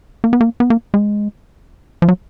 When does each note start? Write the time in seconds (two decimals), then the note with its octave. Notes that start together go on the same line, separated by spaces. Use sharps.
0.24 A#3
0.33 B3
0.41 A#3
0.60 B3
0.70 A#3
0.94 G#3
2.02 F3
2.08 F#3